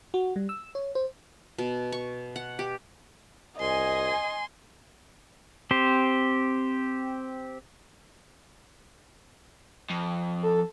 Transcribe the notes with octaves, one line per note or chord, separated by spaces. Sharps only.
F#4
G3
E6
C#5
C5
B2
C#6
F#5
G4
C2 D#5 G#5 C6
C4 G4 C5
F2
A4